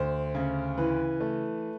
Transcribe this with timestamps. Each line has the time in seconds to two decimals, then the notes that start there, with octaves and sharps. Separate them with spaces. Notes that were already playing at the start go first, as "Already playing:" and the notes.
Already playing: D2 C5
0.35 C#3
0.78 E3 B4
1.20 A3